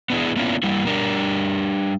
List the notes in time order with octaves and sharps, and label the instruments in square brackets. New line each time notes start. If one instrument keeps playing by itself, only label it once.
[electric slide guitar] B3 D4 E4 G#4
A#3 B3 C#4 D4 E4 F4
G3 A#3 E4
G3 D4 G4 A#4